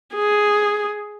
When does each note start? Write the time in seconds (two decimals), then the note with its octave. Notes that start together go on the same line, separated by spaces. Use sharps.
0.15 G#4